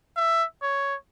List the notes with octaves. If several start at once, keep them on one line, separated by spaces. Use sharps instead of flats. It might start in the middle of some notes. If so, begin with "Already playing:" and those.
E5
C#5